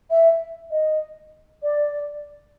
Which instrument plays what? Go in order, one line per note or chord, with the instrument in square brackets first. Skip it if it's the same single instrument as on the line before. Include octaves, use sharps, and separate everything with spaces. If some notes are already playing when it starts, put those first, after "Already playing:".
[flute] E5
D#5
D5